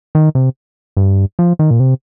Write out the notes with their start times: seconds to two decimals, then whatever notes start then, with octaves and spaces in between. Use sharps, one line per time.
0.15 D#3
0.35 C3
0.97 G2
1.39 F3
1.59 D#3
1.71 A#2
1.80 C3